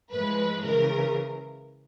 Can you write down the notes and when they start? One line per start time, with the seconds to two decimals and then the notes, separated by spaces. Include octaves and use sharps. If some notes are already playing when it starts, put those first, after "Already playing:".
0.11 A2 F3 G#3 B4
0.64 C#3 E3 A#4